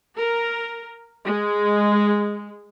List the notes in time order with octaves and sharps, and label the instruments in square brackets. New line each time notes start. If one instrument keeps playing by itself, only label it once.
[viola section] A#4
G#3